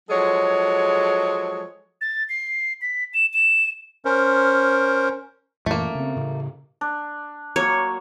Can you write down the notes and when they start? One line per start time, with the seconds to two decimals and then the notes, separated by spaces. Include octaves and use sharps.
0.10 F3 F#3 G#3 G#4 A4 C#5
2.01 A6
2.29 C7
2.81 B6
3.14 E7
3.33 E7
4.05 C#4 A#4 C5
5.66 F#2 A#2 E3 A3 A#3
5.95 C#3 C4
6.16 A2 C#3
6.81 D4
7.56 F#3 A#3 C#5